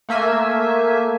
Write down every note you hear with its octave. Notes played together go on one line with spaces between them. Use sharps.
A3 A#3 E5 G#5